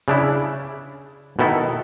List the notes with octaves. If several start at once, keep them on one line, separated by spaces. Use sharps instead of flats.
C#3 D4 E4
B2 D#3 E4 A4